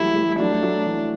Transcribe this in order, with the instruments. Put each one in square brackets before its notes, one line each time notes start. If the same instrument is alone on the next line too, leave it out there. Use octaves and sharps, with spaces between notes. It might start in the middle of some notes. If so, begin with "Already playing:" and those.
Already playing: [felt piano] E3 F#3 G3 A3 [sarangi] E4
[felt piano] E3 G3
[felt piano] F#3 A3 [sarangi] D4
[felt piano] F#3 A3
E3